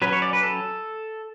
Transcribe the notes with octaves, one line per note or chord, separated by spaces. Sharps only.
F#3 C#4 B4
C#5
D5
B4
A4